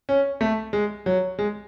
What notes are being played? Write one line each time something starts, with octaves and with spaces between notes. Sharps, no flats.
C#4
A3
G#3
F#3
G#3